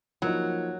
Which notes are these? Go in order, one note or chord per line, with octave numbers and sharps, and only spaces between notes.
F3 F#3 A#3 D#4